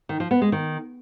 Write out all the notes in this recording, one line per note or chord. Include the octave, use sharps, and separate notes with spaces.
D#3
F3
B3
G#3
D#3